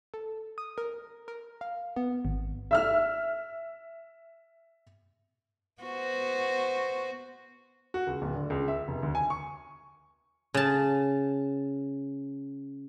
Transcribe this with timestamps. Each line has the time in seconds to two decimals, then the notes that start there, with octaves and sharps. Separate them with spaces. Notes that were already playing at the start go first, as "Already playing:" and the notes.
0.14 A4
0.58 D#6
0.78 A#4
1.28 A#4
1.61 F5
1.96 B3
2.25 G#1
2.71 E5 E6 F6
5.82 B3 F#4 C5
7.94 F#4
8.07 C#2
8.22 D1
8.35 D3
8.50 C#2
8.68 E5
8.88 F1
9.03 D2
9.15 G#5
9.30 C#6
10.54 C#3 A5